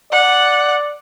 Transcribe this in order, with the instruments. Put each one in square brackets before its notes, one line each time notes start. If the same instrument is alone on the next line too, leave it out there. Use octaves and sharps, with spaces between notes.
[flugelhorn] D5 [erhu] F#5